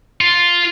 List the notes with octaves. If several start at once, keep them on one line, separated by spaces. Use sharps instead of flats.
F4